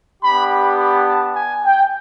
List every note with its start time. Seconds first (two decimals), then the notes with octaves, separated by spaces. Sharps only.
0.22 B3 D4 G4 B5
0.79 B5
1.07 A5
1.36 G#5
1.65 G5